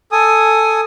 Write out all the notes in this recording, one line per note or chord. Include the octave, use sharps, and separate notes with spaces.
A4 G#5 D#6